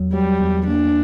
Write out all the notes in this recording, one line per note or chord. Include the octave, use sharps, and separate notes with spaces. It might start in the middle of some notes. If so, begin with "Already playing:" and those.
Already playing: E2 F#3
F#3 G3
E2
A#3 D4